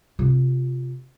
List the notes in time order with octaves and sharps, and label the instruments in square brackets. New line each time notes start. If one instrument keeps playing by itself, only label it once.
[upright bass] C3 F4